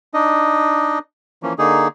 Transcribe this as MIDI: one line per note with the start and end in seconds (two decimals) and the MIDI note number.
0.14 0.99 62
0.14 0.99 63
0.14 0.99 75
1.43 1.53 52
1.43 1.53 53
1.43 1.53 58
1.43 1.53 61
1.59 1.88 50
1.59 1.88 58
1.59 1.88 63
1.59 1.88 68